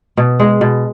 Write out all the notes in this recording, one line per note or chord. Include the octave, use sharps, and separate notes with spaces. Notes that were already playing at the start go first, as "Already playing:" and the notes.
B2
G#3
B2